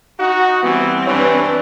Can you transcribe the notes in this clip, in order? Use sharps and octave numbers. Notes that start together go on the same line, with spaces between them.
D#4 F#4 F#5
E3 G3 B3 C4
E3 D4 B4 C#5